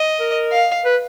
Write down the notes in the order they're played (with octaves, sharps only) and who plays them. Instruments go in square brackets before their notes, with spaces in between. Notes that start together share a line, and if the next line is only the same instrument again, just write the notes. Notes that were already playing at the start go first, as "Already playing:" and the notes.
Already playing: [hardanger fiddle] D#5
[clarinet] A#4
[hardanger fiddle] F5
[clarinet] B4